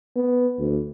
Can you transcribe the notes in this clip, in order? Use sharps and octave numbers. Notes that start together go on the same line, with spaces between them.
B3
D2